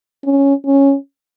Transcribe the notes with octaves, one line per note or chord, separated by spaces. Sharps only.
C#4
C#4